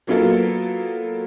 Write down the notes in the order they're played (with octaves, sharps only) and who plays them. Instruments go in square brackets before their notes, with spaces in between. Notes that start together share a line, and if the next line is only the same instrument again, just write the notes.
[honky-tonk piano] F#3 A#3 B3 F4 A4 A#4